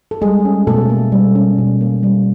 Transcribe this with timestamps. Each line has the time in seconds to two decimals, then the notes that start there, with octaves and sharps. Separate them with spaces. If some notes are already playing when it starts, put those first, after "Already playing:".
0.11 A4
0.21 G3 G#3 G#4
0.45 C#4
0.67 B2 A3 A4
0.90 A#3
1.12 G3
1.35 C#4
1.58 B2
1.81 A#3
2.03 G3